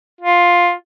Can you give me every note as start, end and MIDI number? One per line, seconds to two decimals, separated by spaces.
0.21 0.72 65